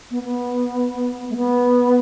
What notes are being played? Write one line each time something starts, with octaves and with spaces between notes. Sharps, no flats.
B3
B3
A3
B3